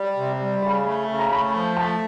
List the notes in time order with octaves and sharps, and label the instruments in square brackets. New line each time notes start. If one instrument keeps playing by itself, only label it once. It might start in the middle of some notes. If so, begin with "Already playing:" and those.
Already playing: [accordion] G3
C3
G3
[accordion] C#3 [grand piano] B5
[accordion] A3
C#3
[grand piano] A#5
[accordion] A3 [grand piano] B5
[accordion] F3
[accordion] A3 [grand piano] A5